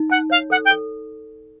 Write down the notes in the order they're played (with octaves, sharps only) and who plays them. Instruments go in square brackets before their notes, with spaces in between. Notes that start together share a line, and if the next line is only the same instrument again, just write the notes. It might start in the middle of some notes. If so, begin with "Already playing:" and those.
Already playing: [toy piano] D#4
[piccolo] F#5 [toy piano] A5
[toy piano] C#5 [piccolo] F5
[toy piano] A4 [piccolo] F#5
[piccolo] G5
[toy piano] A4